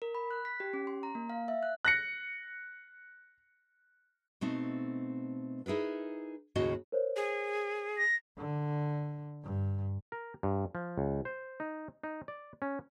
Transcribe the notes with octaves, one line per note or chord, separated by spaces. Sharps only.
A#4
B5
F#6
B6
G4
C#4
C6
A#5
A#3
F5
E5
F#6
F#6 A#6 C#7
B2 A3 C4 D#4
D#4 E4 G#4 A#4 B4
D#2 A2 C#3 F#4 D#5
A#4 C5 C#5
G#4
A#6
D3
G2
A#4
G2
F3
C#2
C5
D#4
D#4
D5
C#4